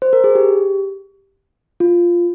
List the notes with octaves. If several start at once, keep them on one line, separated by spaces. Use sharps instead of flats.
C5
A#4
G#4
G4
F4